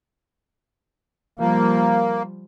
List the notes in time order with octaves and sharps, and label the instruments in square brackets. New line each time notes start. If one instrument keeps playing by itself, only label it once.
[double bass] F3 G3 [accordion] A#3